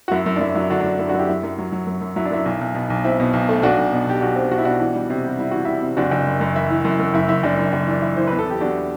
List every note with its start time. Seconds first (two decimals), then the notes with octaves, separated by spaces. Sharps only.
0.08 F#4
0.11 F#2 E4
0.26 F#2
0.36 D4
0.40 F#2 E4
0.55 F#3 E4
0.70 D3 D4 F#4
0.80 D4
0.84 F#3
0.99 F#2 E4
1.09 D4 F#4
1.14 F#2 E4 G4
1.28 F#2 E4
1.43 F#2
1.58 F#3
1.72 F#3
1.87 F#2
2.01 F#2
2.16 F#3 E4
2.25 D4
2.31 F#2 E4
2.45 B1
2.61 B1
2.75 B2
2.90 B1
3.04 C4 E4
3.20 B2
3.33 B1
3.49 A3
3.62 B1 D4 F#4
3.78 B1
3.92 B2
4.06 B1 G4
4.21 B1 D4 F#4
4.36 C4
4.51 B1 F#4
4.58 E4
4.65 B2 D4 F#4
4.80 E3
4.95 G3
5.10 C3
5.24 G3
5.38 G3 E4
5.51 E3 F#4
5.65 G3 E4
5.82 C3
5.97 F#1 D4 F#4
6.11 F#1
6.26 F#2
6.41 F#2
6.55 E3 E4
6.70 E3
6.85 F#2
6.99 F#2
7.14 F#1 E4
7.28 F#1 E4
7.43 F#1 D4
7.59 F#2
7.73 F#1
7.87 E3 D4
8.02 E3 E4
8.16 E3 C5
8.27 E2 B4
8.39 A4
8.46 E2 G4
8.61 E2 D4 F#4